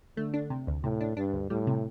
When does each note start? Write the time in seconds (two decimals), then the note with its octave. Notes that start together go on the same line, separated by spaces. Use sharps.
0.17 D3 A3
0.34 D4
0.50 C3
0.67 D2
0.83 A2 C3
1.01 D4
1.17 G2 D4
1.33 D2
1.50 A2 G3
1.67 C3